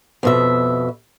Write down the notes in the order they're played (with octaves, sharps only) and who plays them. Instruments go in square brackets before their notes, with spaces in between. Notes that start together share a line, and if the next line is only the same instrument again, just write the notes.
[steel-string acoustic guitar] F2 B2 E5